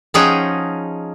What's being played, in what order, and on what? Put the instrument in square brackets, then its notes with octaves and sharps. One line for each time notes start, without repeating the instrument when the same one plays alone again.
[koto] F3 C#4 D#4 G#4 F#5 G5